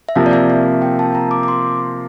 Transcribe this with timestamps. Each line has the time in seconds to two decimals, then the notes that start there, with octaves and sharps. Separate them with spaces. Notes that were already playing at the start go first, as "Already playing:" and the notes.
0.09 E5
0.16 C3 F3 A#3 F5
0.26 D5
0.33 E5
0.50 E5
0.82 G5
0.99 A5
1.15 A#5
1.31 D6
1.43 D6
1.48 C6